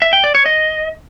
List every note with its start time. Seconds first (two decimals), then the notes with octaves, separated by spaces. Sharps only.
0.02 E5
0.13 G5
0.24 D5
0.35 C#5
0.46 D#5